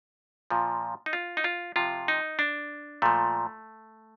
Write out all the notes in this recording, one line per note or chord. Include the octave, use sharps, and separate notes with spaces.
A#2 F3
D#4
F4
D#4
F4
C3 F3 F4
D#4
D4
A#2 F3 A3